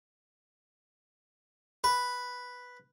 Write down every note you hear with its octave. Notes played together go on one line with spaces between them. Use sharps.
B4